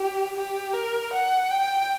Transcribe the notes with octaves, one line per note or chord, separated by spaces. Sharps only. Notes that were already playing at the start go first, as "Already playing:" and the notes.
Already playing: G4
G4
A#4
F#5
G5